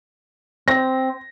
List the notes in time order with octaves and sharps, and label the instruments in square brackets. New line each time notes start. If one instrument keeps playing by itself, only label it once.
[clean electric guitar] C4 [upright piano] A#6